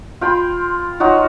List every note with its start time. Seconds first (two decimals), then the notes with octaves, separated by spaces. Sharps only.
0.21 F4 G5 B5 C6
1.00 F#3 D#4 F4 F#4